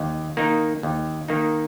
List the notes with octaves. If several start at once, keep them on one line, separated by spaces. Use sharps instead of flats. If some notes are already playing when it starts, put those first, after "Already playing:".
Already playing: D#2
D#3 A#3 D#4
D#2
D#3 A#3 D#4